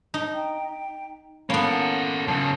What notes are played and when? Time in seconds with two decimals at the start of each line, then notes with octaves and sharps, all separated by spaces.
0.14 D#4
0.34 G5
1.50 A#3 B3 C#4 A4 B5
1.70 F#5
2.28 F#2 C#3 A5